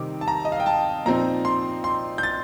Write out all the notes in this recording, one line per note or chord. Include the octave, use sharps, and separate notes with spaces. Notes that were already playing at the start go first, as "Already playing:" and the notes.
Already playing: C3 D#3 G3 C4 D#4 D6
A5
A#5
D#5
F5
G5
A5
A#2 F3 C4 D#4 A#5
C6
C6
G6
A6